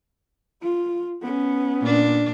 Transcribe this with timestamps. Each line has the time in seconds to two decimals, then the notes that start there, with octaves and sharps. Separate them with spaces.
0.62 F4
1.22 B3 C#4
1.81 A#2 D4